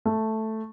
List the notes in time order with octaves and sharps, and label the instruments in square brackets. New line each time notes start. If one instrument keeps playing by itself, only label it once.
[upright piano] A3